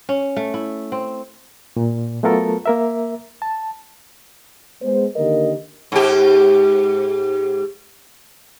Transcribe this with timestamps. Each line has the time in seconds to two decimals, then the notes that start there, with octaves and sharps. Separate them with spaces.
0.09 C#4
0.36 A3
0.54 E4
0.92 C4
1.77 A#2
2.23 F#3 A3 B3 F4 A4 A#4
2.66 A#3 A#4 E5
3.42 A5
4.82 G#3 B3 C5
5.16 D3 D#3 A#3 G4 A#4 D#5
5.92 G#2 G4